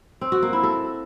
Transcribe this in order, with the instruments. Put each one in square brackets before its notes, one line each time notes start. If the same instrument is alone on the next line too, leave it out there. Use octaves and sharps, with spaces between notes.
[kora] C4
F#4
A#3
E4
A4